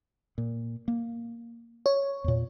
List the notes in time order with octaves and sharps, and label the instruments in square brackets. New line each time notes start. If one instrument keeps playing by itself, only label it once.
[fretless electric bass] A#2
A#3
[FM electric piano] C#5
[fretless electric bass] E2 A#2